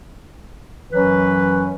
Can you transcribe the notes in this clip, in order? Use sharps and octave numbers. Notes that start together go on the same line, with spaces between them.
F#2 E3 F#3 C#4 B4